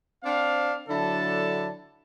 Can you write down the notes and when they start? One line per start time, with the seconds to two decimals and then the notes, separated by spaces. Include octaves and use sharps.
0.24 C4 D4 F5
0.89 D3 F#3 D4 E4 A4 A5